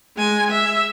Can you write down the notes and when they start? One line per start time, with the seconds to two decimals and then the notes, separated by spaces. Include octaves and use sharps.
0.17 G#3 G#5
0.50 E5